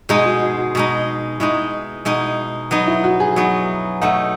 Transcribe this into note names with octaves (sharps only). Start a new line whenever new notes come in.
B2 G#3 D#4 G#4
F#4
F#4
F#4
B2 G#3 D#4
B2 G#3 D#4 E4
B2 G#3 D#4
F#3 B3 D#4
E4
F#4
G#4
F#3 B3 D#4
B2 A3 D#4 F#5